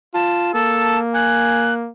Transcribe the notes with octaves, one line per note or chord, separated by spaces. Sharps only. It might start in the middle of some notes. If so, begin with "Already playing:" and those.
F4 A5
A#3 A4 A5
G#5 F#6